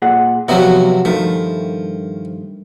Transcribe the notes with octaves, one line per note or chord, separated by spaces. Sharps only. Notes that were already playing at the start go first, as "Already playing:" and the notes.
A#2 G#4 F#5
E2 C3 F3 F#3 B3 F#4
G2 D#3 F3 A3